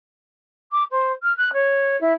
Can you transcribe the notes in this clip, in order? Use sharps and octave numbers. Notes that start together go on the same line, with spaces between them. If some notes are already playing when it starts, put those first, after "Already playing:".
D6
C5
F6
F#6
C#5
E4